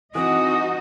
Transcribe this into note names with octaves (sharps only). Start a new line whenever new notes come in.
E3 C4 D#4 F#4 D#5 D#6